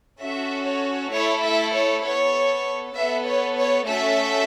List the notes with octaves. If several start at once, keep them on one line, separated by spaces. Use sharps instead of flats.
C#4 F#4 A4 E5
C#5
A3 E4 A4 C#5
E5
C#5
B3 A4 C#5
B3 A4 E5
C#5
C#5
A3 C#4 F#4 A4 E5